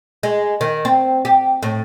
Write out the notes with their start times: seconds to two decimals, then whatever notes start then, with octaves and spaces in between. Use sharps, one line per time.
0.23 G#3
0.61 D#3
0.85 C4
1.25 G4
1.63 A2